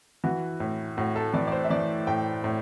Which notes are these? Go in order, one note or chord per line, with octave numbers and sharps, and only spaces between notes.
E3 F#4
A2
A2 F#4
A4
E3 D5
D5
C5
E5
E3 D5
A2 G5
A2